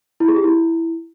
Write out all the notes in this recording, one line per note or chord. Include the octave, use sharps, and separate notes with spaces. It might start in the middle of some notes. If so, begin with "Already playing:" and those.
E4
G#4
G4
E4